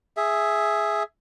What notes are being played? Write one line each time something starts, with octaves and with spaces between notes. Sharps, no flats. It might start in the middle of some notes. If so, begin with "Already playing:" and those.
G#4 E5